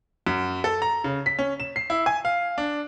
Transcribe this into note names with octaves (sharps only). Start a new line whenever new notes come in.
F#2
A4
A#5
C#3
B6
C#4
E7
C7
E4
G#5
F5
D4